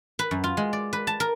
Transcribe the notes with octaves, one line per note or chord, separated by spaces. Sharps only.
B4
F#2
F4
G#3
D5
B4
A5
A#4